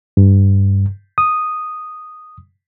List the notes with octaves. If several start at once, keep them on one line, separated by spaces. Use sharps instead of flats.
G2
D#6